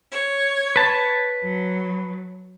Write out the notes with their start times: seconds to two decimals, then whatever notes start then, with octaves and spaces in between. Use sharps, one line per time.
0.11 C#5
0.76 B4 A5
1.43 F#3